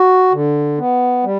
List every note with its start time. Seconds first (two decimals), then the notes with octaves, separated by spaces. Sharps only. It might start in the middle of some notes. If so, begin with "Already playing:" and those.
Already playing: F#4
0.32 D3
0.78 B3
1.24 G3